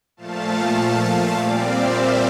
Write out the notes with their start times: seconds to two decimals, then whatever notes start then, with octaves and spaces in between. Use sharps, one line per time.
0.17 A#2 F3 A3 F5 A5
1.35 A#2 G3 C4 D5 F5
1.65 C5 E5
1.94 A#4 D5